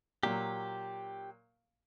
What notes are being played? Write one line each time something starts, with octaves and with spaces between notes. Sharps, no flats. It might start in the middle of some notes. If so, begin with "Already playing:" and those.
A#2 F#3 G4